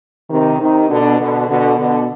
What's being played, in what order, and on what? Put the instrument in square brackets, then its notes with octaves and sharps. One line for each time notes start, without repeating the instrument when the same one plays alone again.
[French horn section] C3 D#3
C3 D#3
B2 D3
B2 D3
B2 D3
B2 D3